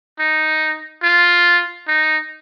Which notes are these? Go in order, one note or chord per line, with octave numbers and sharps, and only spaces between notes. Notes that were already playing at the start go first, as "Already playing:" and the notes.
D#4
F4
D#4